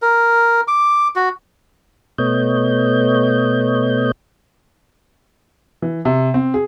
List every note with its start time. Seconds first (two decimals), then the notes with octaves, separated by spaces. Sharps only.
0.02 A#4
0.68 D6
1.16 F#4
2.18 B2 A3 B3 C#5 D#5 G6
5.82 E3
6.05 C3
6.34 C4
6.54 G#4